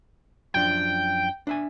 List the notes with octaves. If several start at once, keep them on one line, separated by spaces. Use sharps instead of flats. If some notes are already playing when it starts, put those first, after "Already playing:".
F#2 F3 D4 G5
D4 E5 G#5